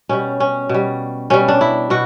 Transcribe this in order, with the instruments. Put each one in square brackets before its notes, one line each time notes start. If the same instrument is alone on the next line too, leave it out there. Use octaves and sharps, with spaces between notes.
[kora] B2 G3 C#4
C#4
B2 G3
B2 G3 C#4
D4
E4
B2 F#4